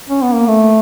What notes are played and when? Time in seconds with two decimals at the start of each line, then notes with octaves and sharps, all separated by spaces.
0.09 C#4
0.22 B3
0.34 A#3
0.48 A3